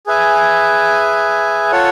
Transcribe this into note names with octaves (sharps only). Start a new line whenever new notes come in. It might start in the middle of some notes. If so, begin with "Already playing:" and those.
G#4 B4 E5 G#5
F4 A4 C#5 F#5